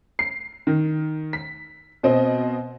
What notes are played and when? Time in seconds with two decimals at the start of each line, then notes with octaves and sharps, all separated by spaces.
0.19 C7
0.67 D#3
1.33 B6
2.03 B2 C4 D#5